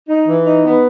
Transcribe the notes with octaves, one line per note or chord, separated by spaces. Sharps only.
D#4
E3
D#4
B3